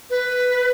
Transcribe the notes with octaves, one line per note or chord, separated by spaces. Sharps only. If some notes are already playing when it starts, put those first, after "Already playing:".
B4